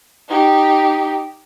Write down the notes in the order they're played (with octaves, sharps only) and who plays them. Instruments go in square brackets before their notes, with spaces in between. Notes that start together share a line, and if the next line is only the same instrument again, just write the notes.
[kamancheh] D#4 G4